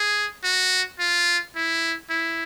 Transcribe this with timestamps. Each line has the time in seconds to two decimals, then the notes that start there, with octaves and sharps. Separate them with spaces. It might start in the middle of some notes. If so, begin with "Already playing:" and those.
Already playing: G#4
0.44 F#4
0.99 F4
1.56 E4
2.10 E4